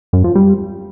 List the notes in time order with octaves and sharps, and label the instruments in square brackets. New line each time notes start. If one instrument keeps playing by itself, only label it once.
[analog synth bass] F#2
F3
G3